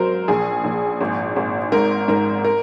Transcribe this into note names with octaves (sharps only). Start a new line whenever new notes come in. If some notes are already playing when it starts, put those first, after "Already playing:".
Already playing: G#1 F#3 A#4 C5
A#1 G#4
A#1
G#1
G#1
G#2 A#4
G#2 A#4
A#4